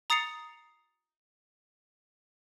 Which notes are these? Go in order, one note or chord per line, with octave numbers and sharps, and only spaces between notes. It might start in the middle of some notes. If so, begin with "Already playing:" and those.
A#5 D#6 A6 C7 C#7 F7